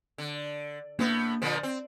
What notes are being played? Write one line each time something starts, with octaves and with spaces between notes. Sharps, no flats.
D3
A2 A#3 B3 D4 G4
A#2 D3 F3 C5 C#5 D#5
C4